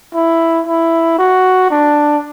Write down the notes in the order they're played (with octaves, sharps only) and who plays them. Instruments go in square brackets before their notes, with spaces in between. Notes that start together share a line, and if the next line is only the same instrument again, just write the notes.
[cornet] E4
E4
F#4
D4